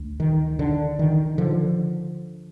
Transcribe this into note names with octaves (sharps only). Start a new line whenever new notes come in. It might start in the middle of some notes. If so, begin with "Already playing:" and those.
Already playing: D2
D#3
D3
D#3
D3 F3